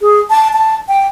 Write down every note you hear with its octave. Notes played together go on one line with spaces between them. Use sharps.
G#4
A5
A5
G5